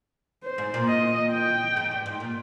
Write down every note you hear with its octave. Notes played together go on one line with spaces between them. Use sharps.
C5
G#2
A#2
D#5
G5
G#2
G2
G#2
A#2